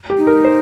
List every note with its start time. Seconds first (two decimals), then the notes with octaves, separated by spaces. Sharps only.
0.10 G4
0.18 D#4
0.27 A#4
0.45 C5